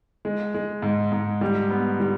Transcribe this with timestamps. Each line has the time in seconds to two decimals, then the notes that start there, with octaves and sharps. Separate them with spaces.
0.25 G#3
0.54 G#3
0.82 G#2
1.12 G#2
1.41 G3
1.70 B3
2.00 G3